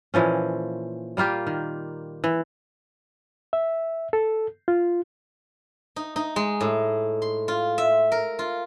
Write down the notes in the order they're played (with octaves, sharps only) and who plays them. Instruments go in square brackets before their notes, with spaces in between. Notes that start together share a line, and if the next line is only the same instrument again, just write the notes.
[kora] A#2 E3 F3 C#4
G3 A#3 F4 G4
D#3
E3
[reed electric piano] E5
A4
F4
[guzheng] D#4
D#4
G#3
A2
C6
F4
E5
A#4
F4